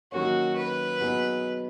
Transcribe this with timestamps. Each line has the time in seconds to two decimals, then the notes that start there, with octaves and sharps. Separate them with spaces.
0.12 D#3 F#3 A#3 C#4 F#4
0.56 B4
1.00 B2 F#3 B3 D#4 G#4